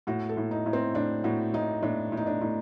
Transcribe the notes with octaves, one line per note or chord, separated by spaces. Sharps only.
A2 F#4
A4
A2
D#4
A2
C4
A2 D4
A2 F#4
A2 D#4
A2 D4
A2
D#4
D4
A2